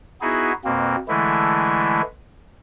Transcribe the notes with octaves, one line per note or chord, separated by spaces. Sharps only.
B3 D#4 E4 F#4 G#4
F2 B2 A#3 C4
D3 E3 G#3 A3 E4